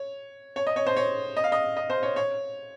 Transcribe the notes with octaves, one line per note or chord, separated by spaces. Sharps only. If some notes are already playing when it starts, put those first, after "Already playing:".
Already playing: C#5
C#5
D#5
C#5
C5
C#5
D#5
F5
D#5
D#5
C5
C#5
C#5